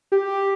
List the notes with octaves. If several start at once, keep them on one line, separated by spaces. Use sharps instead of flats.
G4